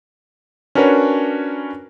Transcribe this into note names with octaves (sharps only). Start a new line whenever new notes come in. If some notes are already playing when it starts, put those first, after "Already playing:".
C#4 D4 F#4 A#4 B4 C#5